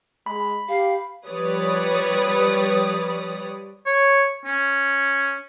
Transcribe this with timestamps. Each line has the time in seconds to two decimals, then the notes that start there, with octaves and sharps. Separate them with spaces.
0.26 G#3 B5
0.68 G4 F5
1.27 F3 G3 B4 C#5 D5 D#6
3.86 C#5
4.45 C#4